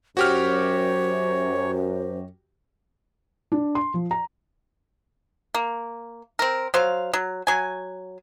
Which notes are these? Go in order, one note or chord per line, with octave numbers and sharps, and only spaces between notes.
F#2 F#4 G4 C5 C#5 F6
D4
C6
F3
A#5
A#3
C4 A#4
F#3 C5 F5
F#3
F#3 G#5